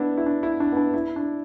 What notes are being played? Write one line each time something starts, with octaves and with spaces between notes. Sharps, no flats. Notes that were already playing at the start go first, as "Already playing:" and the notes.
Already playing: B3 D4 E4
E4
D4
E4
D4
B3
D4
E4
D4